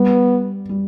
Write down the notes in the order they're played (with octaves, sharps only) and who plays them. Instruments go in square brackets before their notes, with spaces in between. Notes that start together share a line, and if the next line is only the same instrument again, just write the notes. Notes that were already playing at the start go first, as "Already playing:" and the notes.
Already playing: [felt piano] G3 [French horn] B3
[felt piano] G3